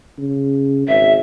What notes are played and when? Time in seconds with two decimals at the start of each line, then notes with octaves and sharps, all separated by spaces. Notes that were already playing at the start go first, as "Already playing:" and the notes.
0.18 C#3
0.88 G#1 E5